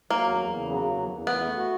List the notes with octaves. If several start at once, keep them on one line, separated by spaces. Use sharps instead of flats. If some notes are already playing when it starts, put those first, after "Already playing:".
F#3 A#3
E2
E2
C#3
F#3
E2
E2
E2
A3 B3
A3
F#4